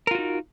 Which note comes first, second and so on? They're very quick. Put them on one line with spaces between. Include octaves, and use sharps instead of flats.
A#4 F4 F#4 D#4